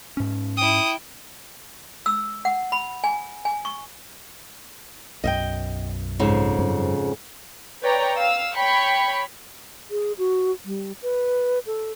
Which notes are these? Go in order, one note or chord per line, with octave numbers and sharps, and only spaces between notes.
G#2 C#4
E4 G5 D#6
E6
F#5
B5
G#5
G#5
C#6
B1 F#2 D#5 E5 G5
F2 G#2 C#3
F#2 G3 C4
B4 C#5 D5 G5 A#5
F5 E6
C#5 G5 B5 C#6
G#4
F#4
G3
B4
A4